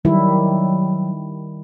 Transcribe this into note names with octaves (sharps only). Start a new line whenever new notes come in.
D#3 F#3 G3 E4